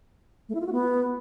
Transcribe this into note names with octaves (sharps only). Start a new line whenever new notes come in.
A3
E4
F4
F#4
B3